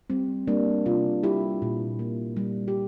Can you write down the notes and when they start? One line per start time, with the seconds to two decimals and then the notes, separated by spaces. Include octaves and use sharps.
0.10 G3 C4
0.47 G3 A#3 D4
0.86 C3 D4 F4
1.23 G3 E4 G4
1.62 A#2
1.99 A#3
2.37 G3
2.68 G4